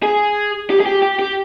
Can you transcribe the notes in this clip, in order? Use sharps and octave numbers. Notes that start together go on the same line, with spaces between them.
G#4
G4
G#4
G4
G4
G4